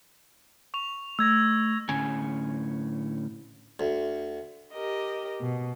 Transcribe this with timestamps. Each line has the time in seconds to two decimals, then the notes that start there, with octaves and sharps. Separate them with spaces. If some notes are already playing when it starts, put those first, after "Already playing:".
0.74 C#6 F7
1.19 A3 E6 G#6 A#6
1.89 A2 D3 C#4 G#5
3.80 D2
4.73 G4 A#4 D#5
5.41 B2